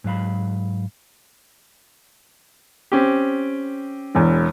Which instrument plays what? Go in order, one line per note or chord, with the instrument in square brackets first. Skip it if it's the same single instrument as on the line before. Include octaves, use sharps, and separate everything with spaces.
[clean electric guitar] G#2 F#3 F5 B5
[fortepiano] C4 C#4 G4
[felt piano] E1 E2